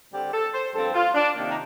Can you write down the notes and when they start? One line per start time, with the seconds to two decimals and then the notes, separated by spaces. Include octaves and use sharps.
0.12 D3 G3 C4 G4
0.33 A4
0.53 C5
0.73 G2 F3 C4 A4
0.94 F4
1.14 D4
1.33 C3 D#3 A#3
1.49 D#4